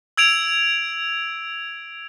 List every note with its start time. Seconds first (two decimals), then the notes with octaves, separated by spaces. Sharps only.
0.17 E6 G#6 D7 F7